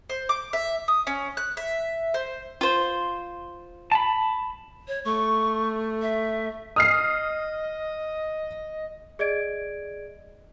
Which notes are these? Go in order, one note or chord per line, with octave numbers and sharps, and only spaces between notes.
C5
D6
E5
D#6
C#4
F#6
E5
C5
F4 C5
A5 B5
C#5
A3 C#6
E5
D#5 D#6 F6 C7
G#4 D5 D#5 G#6 D7